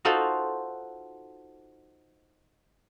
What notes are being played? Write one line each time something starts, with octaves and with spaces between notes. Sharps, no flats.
D#4 F4 F#4 A4 C5